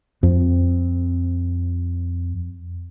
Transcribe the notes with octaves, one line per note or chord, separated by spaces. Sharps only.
F2 C4